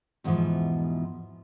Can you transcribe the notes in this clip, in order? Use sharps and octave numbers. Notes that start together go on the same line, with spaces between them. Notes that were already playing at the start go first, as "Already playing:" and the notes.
E2 G#2 B2 D3 E3 F3